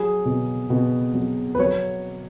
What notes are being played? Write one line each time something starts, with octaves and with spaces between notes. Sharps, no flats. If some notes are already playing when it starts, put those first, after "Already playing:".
Already playing: F#3 G#4
B2
B2
F#3
B4
F#3 C#5